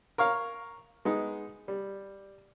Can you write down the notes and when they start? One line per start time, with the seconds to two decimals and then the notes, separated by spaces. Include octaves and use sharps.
0.18 A#4 C#5 F5
1.05 G#3 B3 D#4
1.68 G3